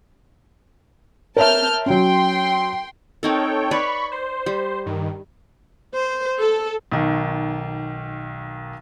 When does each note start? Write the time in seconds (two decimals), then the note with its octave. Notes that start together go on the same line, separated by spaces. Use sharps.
1.37 A#4 C#5 E5 A5 F6 G6
1.86 F#3 C#4 G5 C6
3.23 C4 D#4 A4 A#4 C#5 G5
3.71 B4 C#5 D5 B5 C#6
4.12 C5
4.46 G3 C5
4.86 G2 D#3
5.95 C5
6.40 A4
6.92 B1 D#3